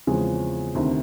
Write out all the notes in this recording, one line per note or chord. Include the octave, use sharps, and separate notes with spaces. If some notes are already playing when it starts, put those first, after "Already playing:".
E2 C#3 F3 G#3 C4
D2 C3 D#3